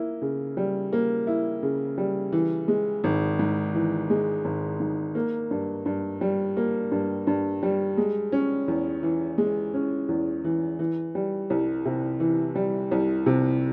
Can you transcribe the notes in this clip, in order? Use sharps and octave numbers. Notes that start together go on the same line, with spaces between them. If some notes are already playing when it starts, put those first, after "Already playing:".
Already playing: A#3 E4
C#3
G3
A#3
E4
C#3
G3
E3
G#3
G#1
G#2
E3
G#3
G#1
G#2
A#3
G2
G2
G3
A#3
G2
G2
G3
G#3
C#4
E2
E3
G#3
C#4
E2
E3
E3
G3
C2
C3
E3
G3
C2
C3